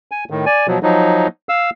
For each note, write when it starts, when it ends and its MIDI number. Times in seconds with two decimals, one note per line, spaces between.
0.11 0.24 80
0.30 0.45 45
0.30 0.45 51
0.46 0.67 74
0.46 0.67 80
0.68 0.79 47
0.68 0.79 53
0.68 0.79 54
0.83 1.27 53
0.83 1.27 54
0.83 1.27 63
1.49 1.70 77
1.49 1.70 88